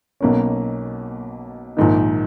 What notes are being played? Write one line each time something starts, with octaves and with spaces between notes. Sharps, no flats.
B1 B2 A#3 C#4
A#1 G#2 D#3